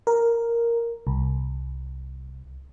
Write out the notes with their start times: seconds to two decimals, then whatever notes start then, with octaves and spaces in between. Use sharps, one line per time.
0.07 A#4
1.07 C2